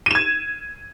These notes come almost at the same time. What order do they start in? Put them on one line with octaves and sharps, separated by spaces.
D#7 E7 G#6